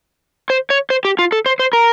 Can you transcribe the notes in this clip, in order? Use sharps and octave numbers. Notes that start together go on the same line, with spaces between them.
C5
C#5
C5
G4
F4
A4
C5
C5
A#4